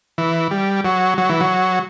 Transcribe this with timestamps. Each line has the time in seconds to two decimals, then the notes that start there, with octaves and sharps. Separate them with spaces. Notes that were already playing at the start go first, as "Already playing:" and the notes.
0.18 E3
0.51 G3
0.85 F#3
1.18 F#3
1.29 E3
1.40 F#3